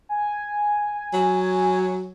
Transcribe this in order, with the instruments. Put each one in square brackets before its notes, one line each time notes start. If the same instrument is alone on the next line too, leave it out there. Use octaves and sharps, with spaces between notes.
[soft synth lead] G#5
[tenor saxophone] F#3